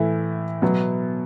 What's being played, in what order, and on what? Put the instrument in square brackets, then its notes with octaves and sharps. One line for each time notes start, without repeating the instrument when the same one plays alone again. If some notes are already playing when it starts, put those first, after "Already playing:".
Already playing: [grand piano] A2 E3 A3 E4
B2 F#3 B3